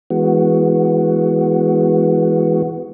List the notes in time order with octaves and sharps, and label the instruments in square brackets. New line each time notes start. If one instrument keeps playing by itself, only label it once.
[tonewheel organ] E3 G#3 B3 F#4